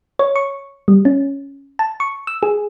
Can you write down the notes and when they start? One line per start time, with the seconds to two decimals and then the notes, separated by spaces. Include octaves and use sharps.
0.19 C#5
0.36 C#6
0.88 G3
1.05 C#4
1.79 A5
2.00 C#6
2.27 E6
2.43 G#4